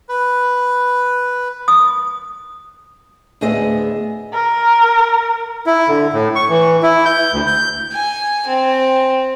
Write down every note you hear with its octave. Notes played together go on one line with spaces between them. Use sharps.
B4
D#6
D2 A2 B3 G#4 D#5 E5
A#4
E4
D3
A2
C#6
E3
E4
G6
D2
G6
G#5
C4